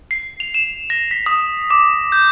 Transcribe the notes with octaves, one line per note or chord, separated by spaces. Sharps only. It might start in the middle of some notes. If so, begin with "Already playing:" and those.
C7
F7
E7
A#6
B6
D#6
D6
G6